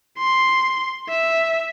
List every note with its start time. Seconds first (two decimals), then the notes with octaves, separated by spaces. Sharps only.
0.18 C6
1.09 E5